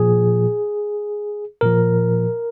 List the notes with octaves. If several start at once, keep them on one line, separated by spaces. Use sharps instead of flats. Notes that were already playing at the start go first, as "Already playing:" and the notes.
Already playing: A#2 F3 G#4
A#2 F3 A#4